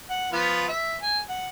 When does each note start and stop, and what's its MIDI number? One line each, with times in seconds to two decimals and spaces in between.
0.09 0.31 78
0.33 0.67 53
0.33 0.67 59
0.33 0.67 65
0.68 0.96 76
1.02 1.21 80
1.29 1.48 78